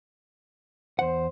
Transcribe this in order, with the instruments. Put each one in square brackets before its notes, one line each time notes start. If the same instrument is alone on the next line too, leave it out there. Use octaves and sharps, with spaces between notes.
[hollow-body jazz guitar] E2 F#5 [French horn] C5